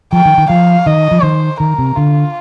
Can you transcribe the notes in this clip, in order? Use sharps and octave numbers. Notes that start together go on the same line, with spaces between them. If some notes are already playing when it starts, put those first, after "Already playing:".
F3 G5
D#3
D#3
F3 F5
D#3 D#5
F3
D#3 C5
D#3 A#4
C3
D3 F4